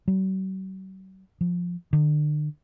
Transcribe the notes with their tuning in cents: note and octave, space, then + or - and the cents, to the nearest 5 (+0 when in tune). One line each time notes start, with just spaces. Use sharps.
F#3 +45
F3 +10
D3 +40